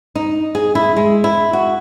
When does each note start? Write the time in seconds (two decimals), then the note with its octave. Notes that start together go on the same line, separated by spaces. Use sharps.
0.15 D#4
0.55 G#4
0.75 E4
0.97 G#3
1.24 E4
1.53 F#4